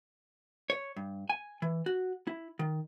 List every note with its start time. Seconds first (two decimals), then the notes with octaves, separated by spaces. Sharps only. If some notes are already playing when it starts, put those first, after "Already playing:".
0.70 C#5
0.97 G2
1.30 G#5
1.62 E3
1.86 F#4
2.27 E4
2.59 D#3